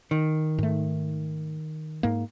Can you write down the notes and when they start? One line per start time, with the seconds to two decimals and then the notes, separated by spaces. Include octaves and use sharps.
0.11 D#3
0.58 G#2 A3
2.03 G#2 A#3